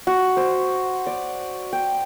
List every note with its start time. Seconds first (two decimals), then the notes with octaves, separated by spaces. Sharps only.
0.07 F#4
0.37 C5
1.07 D5
1.73 G5